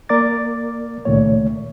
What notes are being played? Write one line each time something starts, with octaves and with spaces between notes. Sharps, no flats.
A#3 A#4 D5 D6 A6
C#2 A#2 D#3 A3 C#5